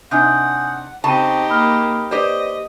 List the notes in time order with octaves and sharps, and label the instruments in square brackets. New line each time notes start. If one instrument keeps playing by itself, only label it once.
[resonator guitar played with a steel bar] C3 D4 D#4 [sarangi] F#5 [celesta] G#5 D#6 G6
[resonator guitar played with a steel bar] C#3 A5 [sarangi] C4 [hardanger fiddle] D#4 G4 [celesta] C#6 D#7
[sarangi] A#3 [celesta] B5 D#6 F6
[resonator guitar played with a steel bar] G4 C5 [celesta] B4 D5 [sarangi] D#5